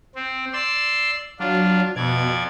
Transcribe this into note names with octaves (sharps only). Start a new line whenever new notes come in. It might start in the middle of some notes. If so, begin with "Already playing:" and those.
C4
D5 C6 E6
F#3 D4 F4
F2 B2 D5 G#6